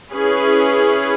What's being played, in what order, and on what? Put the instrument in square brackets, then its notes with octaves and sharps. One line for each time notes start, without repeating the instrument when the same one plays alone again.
[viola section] C#4 E4 G#4 B4